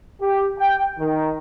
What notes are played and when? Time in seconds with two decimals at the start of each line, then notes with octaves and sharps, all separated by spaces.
0.21 G4
0.58 G5
0.99 D#3